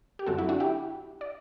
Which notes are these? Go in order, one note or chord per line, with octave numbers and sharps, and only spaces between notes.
G4
F#2 D3 F#3 C4 F#4 A4
E4
D4 F#4
E4 G4
D5